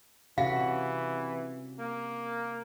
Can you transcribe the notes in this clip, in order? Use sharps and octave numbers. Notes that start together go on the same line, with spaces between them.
C3 E3 C#4 F#4 F5
A#3